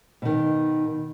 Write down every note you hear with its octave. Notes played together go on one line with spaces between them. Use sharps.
B2 D#3